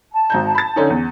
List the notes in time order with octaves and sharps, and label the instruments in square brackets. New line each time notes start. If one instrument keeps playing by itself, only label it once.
[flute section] A5
[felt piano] G#1 A#5 G6
B5 A6
D3 C#4 D#4
E2